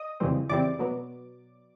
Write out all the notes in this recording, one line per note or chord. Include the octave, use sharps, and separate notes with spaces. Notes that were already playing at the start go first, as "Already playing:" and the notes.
Already playing: D#5 D#6
F2 C#3 E3 G3 C4
F2 C#3 E3 G3 C4 D5 D6
B2 F#3 B3